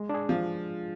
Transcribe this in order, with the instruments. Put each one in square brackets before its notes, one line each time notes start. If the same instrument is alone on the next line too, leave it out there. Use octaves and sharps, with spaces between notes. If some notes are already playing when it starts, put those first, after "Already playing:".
Already playing: [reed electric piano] G#3
D4 G#4
[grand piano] F3